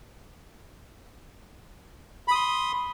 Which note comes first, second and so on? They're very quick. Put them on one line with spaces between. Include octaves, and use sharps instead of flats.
B5 D#6 C6